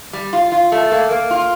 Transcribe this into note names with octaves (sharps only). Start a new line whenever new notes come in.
G3
F4
F4
A3
A#3
A#3
F4